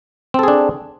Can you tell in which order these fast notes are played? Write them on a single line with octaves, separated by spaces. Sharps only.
C4 A4 G#4 D4